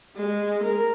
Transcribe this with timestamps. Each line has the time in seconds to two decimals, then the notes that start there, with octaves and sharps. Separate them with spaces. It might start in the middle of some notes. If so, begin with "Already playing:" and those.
0.16 G#3
0.64 A#4